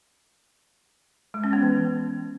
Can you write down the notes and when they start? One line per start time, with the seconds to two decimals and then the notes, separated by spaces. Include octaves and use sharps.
1.34 G#3
1.44 C#4
1.53 B3
1.62 E3